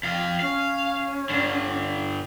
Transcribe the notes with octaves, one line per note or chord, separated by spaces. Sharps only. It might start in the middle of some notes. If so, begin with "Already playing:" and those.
F2 F5
C#4 F5
G2 D3